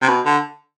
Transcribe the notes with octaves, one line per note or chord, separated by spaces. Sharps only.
C3
B2
D3